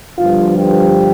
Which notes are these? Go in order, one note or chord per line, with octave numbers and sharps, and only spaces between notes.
G1 G2 F3 F4
G4